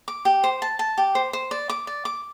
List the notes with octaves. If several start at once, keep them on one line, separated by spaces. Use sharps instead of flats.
D6
G4
C5
A5
A5
G4
C5
C5
D5
D6
D5
D6